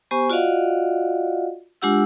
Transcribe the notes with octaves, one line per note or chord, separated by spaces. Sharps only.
B3 G4 C5 G#5 C#6
F4 F#4 D5 D#5 F5 F#5
G#3 D4 F4 G4 F#5 E6